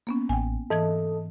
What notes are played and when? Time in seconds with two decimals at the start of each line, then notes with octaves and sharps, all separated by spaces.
0.07 A#3 B3 C#4
0.29 A1 G5 G#5
0.70 G#2 E3 A4 D#5 G#6